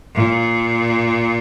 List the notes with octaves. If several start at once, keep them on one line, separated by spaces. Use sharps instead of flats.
A#2